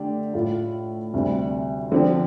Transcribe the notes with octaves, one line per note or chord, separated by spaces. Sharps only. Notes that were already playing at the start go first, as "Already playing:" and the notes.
Already playing: D3 A3 D4 G4
A2 A3 F4
D2 C3 G3 C4
D3 F3 C4 G4